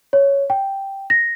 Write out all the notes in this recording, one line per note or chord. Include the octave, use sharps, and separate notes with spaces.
C#5
G5
A#6